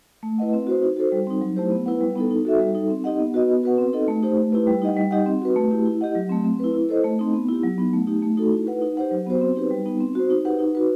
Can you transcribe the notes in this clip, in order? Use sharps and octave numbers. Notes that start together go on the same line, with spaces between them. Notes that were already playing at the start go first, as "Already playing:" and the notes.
A3
E4 B4 D#5 F#5
C4
F#4 C5
D#4
F#4 A4 C5
G3
C4 D#4
F#3
A3 E4 G4 C5
B3
E4 B4 F#5
G3
B3 D#4 A4
D#4
F#4 A4 E5
G3
D#4 A4
C4
D#4 G4 D#5 F#5
B3
F#4 B4 D#5
B3
F#4 B4 F#5
C4
D#4 A4 D#5
A3
D#4 G4 C5
A3
E4 G4 B4
G3
D#4 G4 D#5 F#5
G3
D#4 G4 D#5 F#5
C4
F#4 B4
A3
E4 G4
E4
G4 D#5 F#5
F#3
A3 C4
C4
E4 B4
E4
A4 C5 D#5
A3
C4 D#4
B3
E4 G4
F#3
B3 D#4
A3
D#4 G4
A3
D#4 F#4 A4
E4
B4 F#5
D#4
G4 C5 F#5
F#3
B3 F#4 C5
C4
D#4 G4 B4
G3
B3 D#4
C4
F#4 C5
D#4
G4 B4 F#5
D#4
F#4 B4